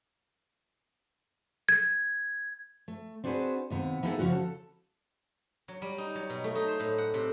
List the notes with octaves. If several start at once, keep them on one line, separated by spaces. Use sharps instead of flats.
G#6
A3
C4 D4 F#4 G#4 B4 C5
D#2 C3 B3
A#3 B3 D#4 E4 G#4 A4
C#3 F3 C#4 F#4
A4
F#3
G3
D#4
F#3
B2
A3
D#4
C5
A2
F#5
C3